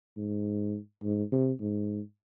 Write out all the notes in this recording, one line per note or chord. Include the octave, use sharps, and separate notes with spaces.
G#2
G#2
C3
G#2